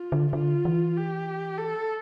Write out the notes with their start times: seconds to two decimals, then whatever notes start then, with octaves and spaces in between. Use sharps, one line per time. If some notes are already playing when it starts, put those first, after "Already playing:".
Already playing: F4
0.12 D3
0.33 D3 F4
0.65 E3
0.96 G4
1.57 A4